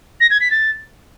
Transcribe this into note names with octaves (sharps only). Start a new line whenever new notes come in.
A#6
G#6
B6
A6